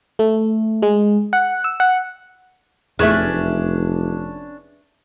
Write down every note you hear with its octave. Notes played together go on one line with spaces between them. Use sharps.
A3
G#3
F#5
E6
F#5
F1 E2 A3 C#4 D4 G#4 B4 E5